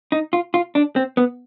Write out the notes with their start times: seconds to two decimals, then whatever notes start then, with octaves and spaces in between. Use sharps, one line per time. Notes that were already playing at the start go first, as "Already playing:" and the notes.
0.12 D#4
0.33 F4
0.54 F4
0.75 D4
0.96 C4
1.17 B3